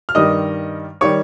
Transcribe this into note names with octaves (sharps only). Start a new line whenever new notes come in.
F6
G2 D#3 G3 D#5 D#6
D#3 G3 C#5 C#6